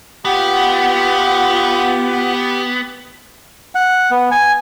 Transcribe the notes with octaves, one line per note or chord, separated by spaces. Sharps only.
B3 F4 G4 B4 F#5
F#5
B3
G#5